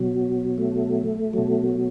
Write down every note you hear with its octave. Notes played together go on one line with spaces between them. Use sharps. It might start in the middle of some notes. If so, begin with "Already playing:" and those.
Already playing: B2 F#3
A3
B2 F#3